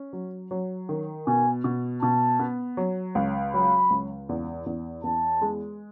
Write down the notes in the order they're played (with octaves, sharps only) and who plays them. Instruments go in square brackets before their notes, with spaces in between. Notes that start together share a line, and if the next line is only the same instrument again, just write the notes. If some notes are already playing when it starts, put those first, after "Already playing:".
Already playing: [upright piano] C#4
F#3
F#3
D#3
[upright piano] B2 [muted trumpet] G#5
[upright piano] B2
[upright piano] B2 [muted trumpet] A5
[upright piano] B3
F#3
C#2
[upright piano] F#3 [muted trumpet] B5
[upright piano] C#2
E2
E2
[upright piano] E2 [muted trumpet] A5
[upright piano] G#3